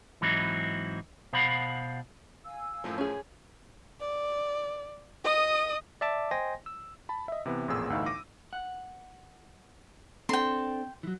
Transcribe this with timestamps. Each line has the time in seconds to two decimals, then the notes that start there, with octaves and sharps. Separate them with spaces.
0.21 G#2 E3 F#3 C4 D#4 E4
1.33 B2 C5 F5 F#5 B5
2.45 F5 G#5 E6
2.84 F#2 A2 F3
2.98 C#4 G#4
4.00 D5
5.24 D#5 D#6
6.01 D5 E5 A5 D6
6.31 C5 D#5 G5 G#5 C6 A#6
6.66 E6
7.09 A5 B5
7.28 D#5 E5
7.46 C3 E3 B3
7.68 A1 F2 A#2 B3 G#4 E6
7.90 G1 D2 A2 E3 D#4 F5
8.06 D6 A#6 D#7
8.53 F#5
10.29 C4 D4 A4 G5 C6
11.03 E3 F#3